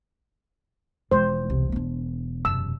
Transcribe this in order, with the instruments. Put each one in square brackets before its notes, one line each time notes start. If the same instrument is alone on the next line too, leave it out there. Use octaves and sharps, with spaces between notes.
[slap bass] E1 [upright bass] F3 G#3 [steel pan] C5
[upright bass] C2 C3
B3 D4
[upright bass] F#2 C3 [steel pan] E6